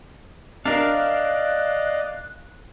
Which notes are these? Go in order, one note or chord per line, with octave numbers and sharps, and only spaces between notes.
D4 A#4 D5 D#5 F5 F#6